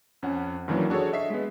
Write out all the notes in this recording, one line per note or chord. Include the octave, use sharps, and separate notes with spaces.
F2 C#4 F#5
F#2 D#3 E3 F#3 A#3 D4
D4 F#4 G#4 A4 C#5
D#5 E5 B6 C7
G#3 B3